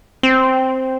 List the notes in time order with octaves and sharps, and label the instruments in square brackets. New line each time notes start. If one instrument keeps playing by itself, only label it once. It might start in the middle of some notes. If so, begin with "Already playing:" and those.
[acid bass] C4